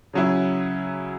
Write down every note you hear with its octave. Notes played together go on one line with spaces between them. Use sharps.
C#3 F#3 C#4 E4